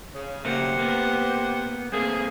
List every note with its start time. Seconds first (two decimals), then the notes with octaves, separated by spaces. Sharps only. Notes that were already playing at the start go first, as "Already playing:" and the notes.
0.14 C#3
0.45 C#3 A3 A#3 G4 C5 F#5
0.79 A#3 B3
1.92 A3 A#3 C4 G#4